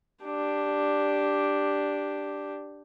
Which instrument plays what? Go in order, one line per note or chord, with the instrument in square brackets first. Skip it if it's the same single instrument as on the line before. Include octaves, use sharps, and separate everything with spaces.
[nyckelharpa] D4 G4